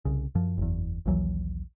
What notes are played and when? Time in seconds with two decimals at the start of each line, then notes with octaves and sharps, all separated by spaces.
0.05 C2 C#3
0.35 F#2 F3
0.58 F#1 E2
1.06 A#1 D#2 E3 F#3